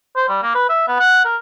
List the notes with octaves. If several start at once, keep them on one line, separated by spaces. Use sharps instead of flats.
C5
G3
A#3
B4
E5
B3
F#5
A#4